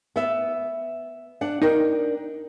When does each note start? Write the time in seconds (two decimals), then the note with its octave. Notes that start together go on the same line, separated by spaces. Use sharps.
0.16 B3 E5
1.41 D4 F#5
1.62 D4 D#4 A#4 G5